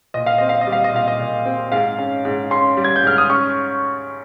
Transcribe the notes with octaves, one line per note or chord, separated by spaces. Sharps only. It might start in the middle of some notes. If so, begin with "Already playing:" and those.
A#2 D#5
F5
C4 D#5
F5
D#5
G3
F5
D#5
A#2 F5
D#5
A#2
C4
G#2 F5
C#4
G#2
C#4 C6
G3
G#6
G6
G#2 F6
D#6
C#4 C#6